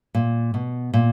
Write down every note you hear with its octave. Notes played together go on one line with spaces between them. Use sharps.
A#2
B2
A#2